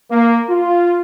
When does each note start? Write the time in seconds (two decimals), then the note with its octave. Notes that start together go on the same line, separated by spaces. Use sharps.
0.11 A#3
0.50 F4